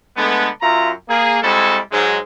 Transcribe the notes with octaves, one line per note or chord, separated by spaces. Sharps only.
D3 G#3 A3 B3
F#2 F4 E5 A#5
A#3 G#4
G3 G#3 C4 E4 F#4 A4
G#2 F#3 G#3